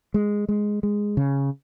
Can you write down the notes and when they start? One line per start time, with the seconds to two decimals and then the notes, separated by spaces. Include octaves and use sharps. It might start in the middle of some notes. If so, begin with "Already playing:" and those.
0.14 G#3
0.49 G#3
0.83 G#3
1.17 C#3